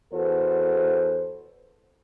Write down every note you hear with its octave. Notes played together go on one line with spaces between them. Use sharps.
E2 F#4 A4 B4 C5